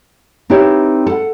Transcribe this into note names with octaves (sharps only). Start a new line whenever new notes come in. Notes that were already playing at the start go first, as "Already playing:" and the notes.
C4 D#4 E4 G4 B4 C#5
A4 F#5